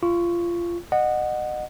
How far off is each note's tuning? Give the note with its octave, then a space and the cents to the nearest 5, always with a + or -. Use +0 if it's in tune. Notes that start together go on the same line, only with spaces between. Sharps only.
F4 -20 C#6 +0
D#5 -30 F#5 -5